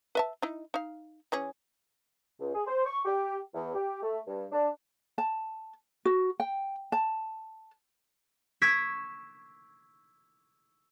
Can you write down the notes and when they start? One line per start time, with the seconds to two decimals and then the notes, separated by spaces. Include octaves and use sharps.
0.15 B4 E5 A5
0.42 D#4 E4
0.74 D#4 F5
1.32 E3 C#4 G#4
2.39 C#2
2.54 G#4
2.67 C5
2.86 C#6
3.05 G4
3.54 E2
3.75 G4
4.03 A3
4.27 G2
4.52 D4
5.18 A5
6.05 F#4
6.40 G5
6.92 A5
8.62 C#6 E6 G#6 A#6 B6 D7